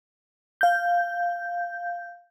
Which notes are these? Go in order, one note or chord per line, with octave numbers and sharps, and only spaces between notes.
F5 G6